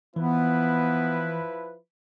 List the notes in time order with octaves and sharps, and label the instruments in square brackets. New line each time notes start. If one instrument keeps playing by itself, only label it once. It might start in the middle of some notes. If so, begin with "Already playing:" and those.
[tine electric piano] E3 [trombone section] F3 E4 B4 [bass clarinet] B3